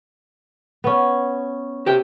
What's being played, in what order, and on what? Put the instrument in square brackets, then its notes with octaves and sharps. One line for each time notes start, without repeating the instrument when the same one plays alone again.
[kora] B3 C#4
[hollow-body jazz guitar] G4 C5 G5